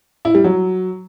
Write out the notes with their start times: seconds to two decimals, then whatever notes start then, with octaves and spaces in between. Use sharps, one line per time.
0.25 E4
0.35 G3
0.44 F#3